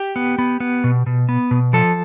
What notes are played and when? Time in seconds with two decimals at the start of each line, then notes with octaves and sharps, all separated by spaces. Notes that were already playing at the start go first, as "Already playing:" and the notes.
Already playing: G4
0.16 B3
0.38 B3
0.60 B3
0.84 B2
1.06 B2
1.29 B3
1.51 B2
1.73 F3 A4